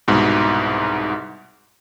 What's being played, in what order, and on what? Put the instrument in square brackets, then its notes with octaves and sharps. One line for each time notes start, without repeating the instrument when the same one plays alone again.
[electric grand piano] C2 G#2 B2